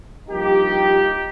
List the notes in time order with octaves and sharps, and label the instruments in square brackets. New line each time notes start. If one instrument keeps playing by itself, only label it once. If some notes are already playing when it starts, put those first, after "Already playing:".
[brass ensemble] G2 F3 A#3 D#4 G4